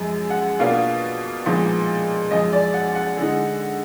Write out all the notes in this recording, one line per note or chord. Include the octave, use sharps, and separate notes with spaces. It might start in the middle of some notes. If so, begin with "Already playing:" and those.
Already playing: F#2 F3 G#3
F#5
B2 A#3 D4 F4 F5
A#2 F3 G#3 B3 D#4
F#2 F3 G#3 D#5
D5
F#5
F#5
D3 G#3 D#4